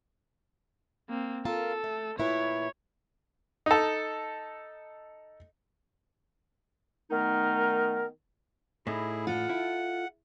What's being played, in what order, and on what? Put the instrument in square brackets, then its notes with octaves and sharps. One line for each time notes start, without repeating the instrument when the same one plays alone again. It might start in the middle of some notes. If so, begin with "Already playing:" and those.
[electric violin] A#3 C4
[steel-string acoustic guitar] F4 A#4 A5 [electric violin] A4
[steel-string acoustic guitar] A3
[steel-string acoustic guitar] A#2 E4 B4 [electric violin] C#5
[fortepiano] D#4 A4
[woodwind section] D#3 A3 B3 D#4 A#4
[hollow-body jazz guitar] A2 D#4 [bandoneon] E4 G#4
[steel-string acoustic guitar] F4 A4 [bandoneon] F#5
[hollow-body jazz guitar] E4